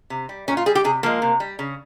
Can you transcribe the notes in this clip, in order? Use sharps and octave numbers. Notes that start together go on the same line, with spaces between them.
C3
G3
A#2 C#4
F4
G3 G#4
G4
C3 G#4
F3 G#3 A#3
C3
G3
C#3